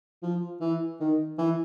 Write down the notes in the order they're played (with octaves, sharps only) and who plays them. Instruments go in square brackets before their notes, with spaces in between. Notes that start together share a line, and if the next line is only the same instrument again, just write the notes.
[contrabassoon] F3
E3
D#3
E3